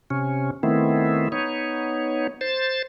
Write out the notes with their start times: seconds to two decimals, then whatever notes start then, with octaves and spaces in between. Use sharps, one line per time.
0.10 C3 C#4
0.63 D#3 A3 B3 C4 E4
1.32 B3 D#4 C#5
2.41 C5 A6